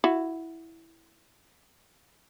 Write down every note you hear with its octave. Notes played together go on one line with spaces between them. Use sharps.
E4 F#4